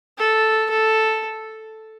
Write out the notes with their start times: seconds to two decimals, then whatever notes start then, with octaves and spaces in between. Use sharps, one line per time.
0.18 A4
0.70 A4